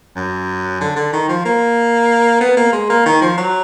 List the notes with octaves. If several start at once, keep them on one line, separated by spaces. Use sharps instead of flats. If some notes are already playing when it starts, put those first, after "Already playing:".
F#2
D3
D3
D#3
F3
A#3
B3
A#3
G#3
A#3
D#3
F3
F#3